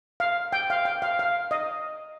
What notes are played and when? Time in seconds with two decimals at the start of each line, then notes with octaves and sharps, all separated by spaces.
0.20 F5
0.53 G5
0.70 F5
0.85 G5
1.02 F5
1.19 F5
1.51 D#5